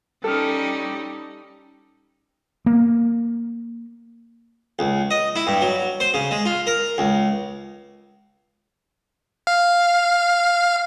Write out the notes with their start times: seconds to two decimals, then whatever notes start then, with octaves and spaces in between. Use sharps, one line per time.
0.24 G3 C#4 D#4 A4 F6
2.66 A#3
4.79 C#2
5.11 D#5
5.36 E4
5.47 G2
5.61 F#3
6.00 C5
6.14 C#3
6.31 G#3
6.46 F4
6.67 A#4
6.98 C#2
9.47 F5